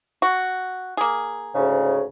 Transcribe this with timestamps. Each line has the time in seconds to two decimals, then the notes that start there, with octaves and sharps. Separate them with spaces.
0.22 F#4
0.97 A#3 G#4
1.55 D2 G#2 C#3